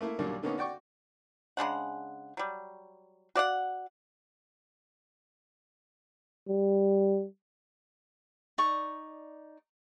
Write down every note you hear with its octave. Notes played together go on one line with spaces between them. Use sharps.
A3 A#3 E4
D#2 A#2 F#3 G3 A#3 D4
D3 A#3 B3 C#4 D#4
F#4 D5 G5 C#6
C#3 G#3 D4 F#5
F#3 G3
F#4 D5 F5 F#5
G3
D#4 D5 C#6 D#6